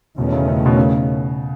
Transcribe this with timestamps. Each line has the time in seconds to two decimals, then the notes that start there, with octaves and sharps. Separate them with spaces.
0.18 E2 B2 D#3 A3 C#4
0.33 C#3
0.48 C#3
0.66 B2
0.77 C#3